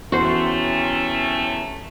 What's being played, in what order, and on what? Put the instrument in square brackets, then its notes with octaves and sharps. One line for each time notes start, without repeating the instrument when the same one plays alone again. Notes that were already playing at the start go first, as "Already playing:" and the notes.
[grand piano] E2 [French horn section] C3 A3 [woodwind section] C#4 [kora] F#4 C5